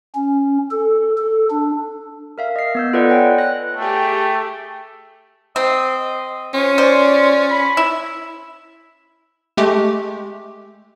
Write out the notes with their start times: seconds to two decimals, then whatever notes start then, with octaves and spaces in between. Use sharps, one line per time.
0.15 C#4
0.70 A4
1.17 A4
1.50 D4
2.38 A#4 E5 F5
2.56 D#5 C7
2.75 B3 E6 G6
2.93 F4 A4 B4 D5 D#5 F#5
3.09 B4 C#5 G5 G#5
3.38 F#6 A#6
3.77 A3 G4 G#4 G5
5.56 C4 D#5
6.54 C#4 F4 C5
6.78 C5 D5
7.51 B5
7.77 E4 E5
9.57 G#3 A3 G4